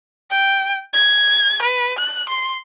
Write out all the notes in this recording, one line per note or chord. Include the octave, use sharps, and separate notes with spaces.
G5
G#6
B4
F#6
C6